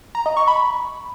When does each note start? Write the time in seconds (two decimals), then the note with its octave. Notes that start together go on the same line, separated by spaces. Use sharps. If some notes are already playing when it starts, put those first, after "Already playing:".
0.15 A#5
0.26 D#5
0.37 C#6
0.48 B5